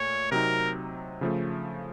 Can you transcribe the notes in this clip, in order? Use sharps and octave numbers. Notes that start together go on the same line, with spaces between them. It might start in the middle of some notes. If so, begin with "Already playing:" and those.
Already playing: A#2 A3 C#5
C3 F#3 C4 D#4 A#4
C#3 F3 A3